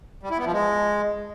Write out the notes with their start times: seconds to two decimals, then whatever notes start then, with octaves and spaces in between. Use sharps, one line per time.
0.23 G3
0.31 E4
0.38 B3
0.45 F3
0.53 G#3